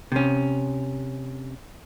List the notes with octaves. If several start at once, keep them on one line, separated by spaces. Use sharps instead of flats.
C3 C#4